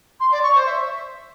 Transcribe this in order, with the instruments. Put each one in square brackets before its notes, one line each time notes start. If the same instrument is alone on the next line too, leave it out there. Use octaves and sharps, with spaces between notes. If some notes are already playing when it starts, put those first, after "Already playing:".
[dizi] C6
D5
C#6
C5
E5